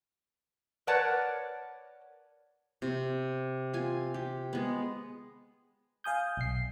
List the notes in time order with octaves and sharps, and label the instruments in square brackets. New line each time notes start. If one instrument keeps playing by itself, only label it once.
[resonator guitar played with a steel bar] A#4 B4 C#5 D5 F#5 A5
[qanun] C3
F4 G#5
G4
G#3 B3
[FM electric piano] F5 G#5 D#6 G6
B1 C7